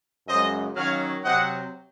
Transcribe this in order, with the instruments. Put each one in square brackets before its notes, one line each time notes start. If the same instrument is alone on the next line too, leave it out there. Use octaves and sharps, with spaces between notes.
[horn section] F#2 C#3 G#3 C5 D#5
D#3 F#3 C#4 C#5 F5
C3 F#3 C4 D#5 F#5